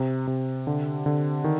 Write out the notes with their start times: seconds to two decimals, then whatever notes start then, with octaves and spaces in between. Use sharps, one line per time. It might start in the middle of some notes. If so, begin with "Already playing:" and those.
Already playing: C3
0.27 C3
0.67 D3
1.06 D3
1.44 D#3